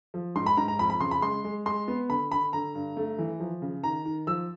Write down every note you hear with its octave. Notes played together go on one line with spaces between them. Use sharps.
F3
G#2 C6
B5
G#2 A#5
A#5
F2 B5
B5
C#3 C6
B5
G#3 C6
G#3
G#3 C6
B3
D3 B5
D3 B5
D3 A#5
G2
A3
E3
F3
C#3
D#3 A#5
D#3
F3 E6